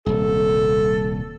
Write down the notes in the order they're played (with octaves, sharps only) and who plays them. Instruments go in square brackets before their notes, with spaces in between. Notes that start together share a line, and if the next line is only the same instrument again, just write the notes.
[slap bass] D#1 C2 [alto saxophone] A4